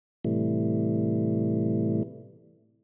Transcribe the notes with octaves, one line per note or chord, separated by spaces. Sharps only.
A2 C3 E3 G3 A3